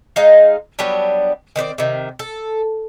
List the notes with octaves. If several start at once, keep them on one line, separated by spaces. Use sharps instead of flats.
G#3 D#4 F5
F#3 G3 B3 D4
D#3 C4 B4 D5
C3 D#3
A4